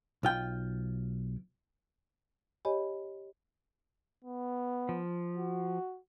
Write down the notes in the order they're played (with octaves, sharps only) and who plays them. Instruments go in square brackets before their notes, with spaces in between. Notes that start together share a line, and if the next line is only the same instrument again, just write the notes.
[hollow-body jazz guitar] B1 F4 G5
[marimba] G4 C#5 D#5 G#5 B5
[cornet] B3
[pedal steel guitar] F3
[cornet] F#4